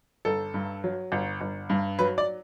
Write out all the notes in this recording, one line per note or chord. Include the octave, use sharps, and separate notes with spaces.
G1 A4
G2
F#3
G1
G1
G2
F#3 B4
D5